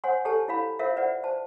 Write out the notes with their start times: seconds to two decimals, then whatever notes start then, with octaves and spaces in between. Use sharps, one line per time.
0.04 C5 C#5 F#5 G#5 C6
0.25 G4 A4 B4 C#5 G#5 A5
0.48 E4 C#5 F5 B5
0.79 F4 A#4 C5 C#5 E5 F5
0.97 B4 C5 D5 E5 F#5
1.23 B4 C5 A5